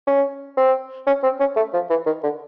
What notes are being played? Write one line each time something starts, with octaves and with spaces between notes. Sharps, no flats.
C#4
C4
C#4
C4
C#4
A3
F3
E3
D#3
D3